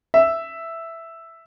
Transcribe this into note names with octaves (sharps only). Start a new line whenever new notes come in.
E5